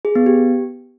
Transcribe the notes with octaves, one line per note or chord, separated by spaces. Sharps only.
G#4
B3
G4